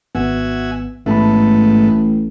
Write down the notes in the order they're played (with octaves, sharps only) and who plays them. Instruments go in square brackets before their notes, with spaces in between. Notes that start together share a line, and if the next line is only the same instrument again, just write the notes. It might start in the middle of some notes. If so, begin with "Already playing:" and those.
[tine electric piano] G#1 B3 [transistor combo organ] F#4 E5 G#5
[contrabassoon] A1 [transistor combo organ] G#2 A3 B3 [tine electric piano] E5 A5 B5